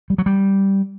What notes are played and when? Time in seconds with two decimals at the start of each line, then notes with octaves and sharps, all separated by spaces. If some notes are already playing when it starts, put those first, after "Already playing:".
0.10 G3
0.18 F#3
0.26 G3